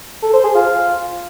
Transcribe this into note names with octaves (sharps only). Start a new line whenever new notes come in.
A4
C5
G#4
F4